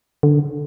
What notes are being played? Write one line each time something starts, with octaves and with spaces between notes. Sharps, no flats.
D3